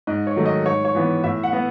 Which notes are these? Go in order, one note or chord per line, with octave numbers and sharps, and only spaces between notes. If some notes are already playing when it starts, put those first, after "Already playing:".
G#2 D#5
C#5
D#3 F#3 A3
D#5
G#2 C#5
C#5
E3 B3
A2 E5
F#5
B3